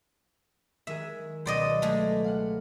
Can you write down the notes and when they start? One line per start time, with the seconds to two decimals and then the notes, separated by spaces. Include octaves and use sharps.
0.87 D#3 G#3 G#4 E5
1.46 C#2 B2 F#3 C5 D5 D#5
1.82 G#3 A3
2.24 F5 F#5